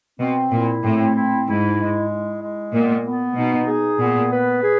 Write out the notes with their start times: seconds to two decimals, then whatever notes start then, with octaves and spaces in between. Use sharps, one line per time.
0.19 B2 C4
0.51 A#2 E4
0.82 A2 C4
1.14 E4
1.46 G#2 E4
1.77 G#3
2.09 E4
2.41 G#3
2.72 A#2 B3
3.04 B3
3.36 B2 D#4
3.68 G#4
3.99 A#2 B3
4.31 B4
4.62 G#4